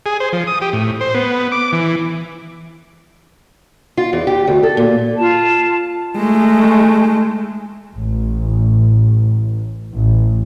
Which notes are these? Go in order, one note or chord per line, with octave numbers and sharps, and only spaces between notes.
G#4
C5
F3
D#6
G4
A2
C5
B3
D6
E3
F4
E2
G4
D2
A4
A#2
F4 A5
G#3 A3
A1
A1